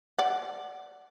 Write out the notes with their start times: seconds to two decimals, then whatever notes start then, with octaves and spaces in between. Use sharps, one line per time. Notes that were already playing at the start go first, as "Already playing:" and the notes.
0.19 D5 F#5